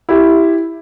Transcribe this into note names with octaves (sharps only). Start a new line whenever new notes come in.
E4 G4